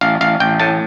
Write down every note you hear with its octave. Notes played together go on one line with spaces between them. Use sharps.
A1 F5
A1 F5
A1 G5
A2 A5